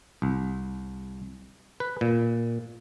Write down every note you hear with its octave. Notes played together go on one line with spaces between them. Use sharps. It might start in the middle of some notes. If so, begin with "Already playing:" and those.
C2
B4
A#2